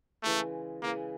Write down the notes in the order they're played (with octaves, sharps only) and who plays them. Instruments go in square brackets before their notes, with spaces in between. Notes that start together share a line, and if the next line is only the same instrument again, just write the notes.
[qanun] C#3 E3 G#3 [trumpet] A3
[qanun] C#3 E3 G#3 [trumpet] A#3